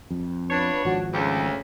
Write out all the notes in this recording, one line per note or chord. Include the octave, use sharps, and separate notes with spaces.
F2
B3 D4 F4 B4 C#5
G#1 F3 F#4
D2 C#3